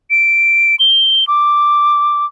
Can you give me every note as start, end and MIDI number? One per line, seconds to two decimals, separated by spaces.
0.10 0.76 98
0.79 1.24 103
1.27 2.26 86